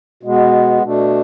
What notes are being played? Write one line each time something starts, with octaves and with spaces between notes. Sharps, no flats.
B2 G#3 B3
B2 A3 D4